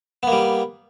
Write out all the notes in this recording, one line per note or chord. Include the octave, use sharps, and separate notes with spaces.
G3 A#3 B3